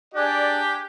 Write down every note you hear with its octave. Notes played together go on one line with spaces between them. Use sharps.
D4 G4 G#4 D5 G#5 A5 F#6